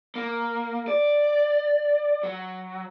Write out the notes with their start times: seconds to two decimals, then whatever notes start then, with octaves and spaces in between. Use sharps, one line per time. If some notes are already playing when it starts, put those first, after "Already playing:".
0.15 A#3
0.88 D5
2.23 F#3